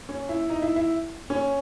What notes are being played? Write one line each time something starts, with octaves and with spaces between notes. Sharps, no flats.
C#4
E4
D#4
E4
E4
C#4